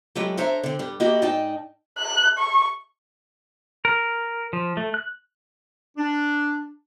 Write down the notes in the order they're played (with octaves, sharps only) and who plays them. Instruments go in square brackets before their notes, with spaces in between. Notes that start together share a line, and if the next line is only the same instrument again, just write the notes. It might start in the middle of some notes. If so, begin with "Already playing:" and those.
[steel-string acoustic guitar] F#3 G#3 A3 E4 F4 G4
D4 A4 C5 C#5 E5 A#5
D3 C4
G2 G3
A#3 E4 F#4 G4 D#5 E5
G#2 D#4 D5 D#5 G5 A5
[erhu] F#6
C#6
[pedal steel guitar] A#4
F3
A3
F#6
[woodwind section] D4